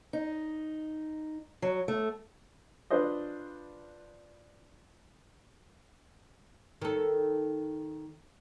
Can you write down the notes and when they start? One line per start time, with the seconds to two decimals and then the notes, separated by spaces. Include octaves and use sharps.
0.13 D#4
1.62 F#3
1.88 A3
2.90 D4 F4 B4 C5 D#5
6.81 D#3 A4